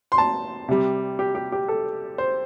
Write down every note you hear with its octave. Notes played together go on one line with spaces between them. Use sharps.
C6
A5
C3 G3
G4
G4
G4
A4
C5